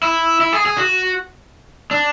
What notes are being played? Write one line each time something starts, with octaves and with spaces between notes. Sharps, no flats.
E4
E4
G#4
G#4
F#4
D4